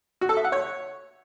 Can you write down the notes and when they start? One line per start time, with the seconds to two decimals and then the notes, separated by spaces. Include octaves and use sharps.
0.21 F#4
0.29 A4
0.37 E5
0.45 F#5
0.52 C#5